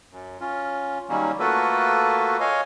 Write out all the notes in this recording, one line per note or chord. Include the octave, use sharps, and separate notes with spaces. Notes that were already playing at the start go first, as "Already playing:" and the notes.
F#2
C#4 F4
D#3 F#3 G3 A#3 C#4
A3 A#3 F4 F#4 A4 B4
C#5 D#5 F5 G#5